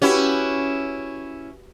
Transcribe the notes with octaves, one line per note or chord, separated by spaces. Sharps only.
C#4 E4 F#4 G4 B4